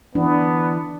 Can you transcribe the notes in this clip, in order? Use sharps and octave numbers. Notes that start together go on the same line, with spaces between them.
E3 B3 D4